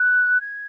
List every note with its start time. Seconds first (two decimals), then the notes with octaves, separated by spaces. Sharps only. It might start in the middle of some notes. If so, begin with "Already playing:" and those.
Already playing: F#6
0.41 G#6